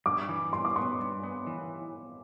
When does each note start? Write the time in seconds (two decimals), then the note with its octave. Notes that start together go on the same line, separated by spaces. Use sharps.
0.06 G2 D6
0.29 E3
0.53 G2 C6
0.65 D6
0.76 B3 C6
1.00 G2
1.24 B3
1.47 E3